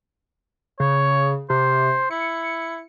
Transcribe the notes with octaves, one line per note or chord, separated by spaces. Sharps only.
C#3 C#5
C3 C5
E4 C#7